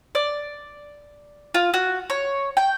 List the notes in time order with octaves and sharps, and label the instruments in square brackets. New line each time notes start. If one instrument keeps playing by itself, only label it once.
[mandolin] D5
F4
F#4
C#5
G5